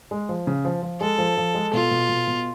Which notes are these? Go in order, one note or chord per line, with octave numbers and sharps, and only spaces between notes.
G#3
F3
C#3
F3
F3
G#3 A4
F3
F3
G#3
B2 F4
B2
B2
B2